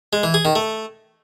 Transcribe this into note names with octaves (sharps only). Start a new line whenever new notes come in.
G#3
E3
G#4
D#3
A3